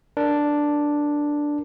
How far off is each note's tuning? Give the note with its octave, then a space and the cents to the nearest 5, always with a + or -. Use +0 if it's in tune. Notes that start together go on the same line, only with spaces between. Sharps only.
D4 +0 A#4 +0